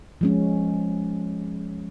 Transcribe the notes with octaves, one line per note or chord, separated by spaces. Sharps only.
F3 G#3 C#4